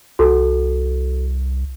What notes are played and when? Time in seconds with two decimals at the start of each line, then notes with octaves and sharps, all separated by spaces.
0.19 C2 F#4 A4